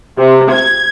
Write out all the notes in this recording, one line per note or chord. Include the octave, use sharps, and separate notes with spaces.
C3
G#6